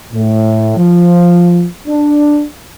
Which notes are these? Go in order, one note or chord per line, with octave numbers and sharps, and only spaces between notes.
A2
F3
D4